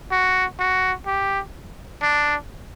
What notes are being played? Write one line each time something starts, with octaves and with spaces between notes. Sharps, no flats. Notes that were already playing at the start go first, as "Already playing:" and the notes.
F#4
F#4
G4
D4